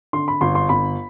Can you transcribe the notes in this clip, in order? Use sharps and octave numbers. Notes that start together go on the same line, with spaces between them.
D3 C6
B5
G1 C6
C6
G1 B5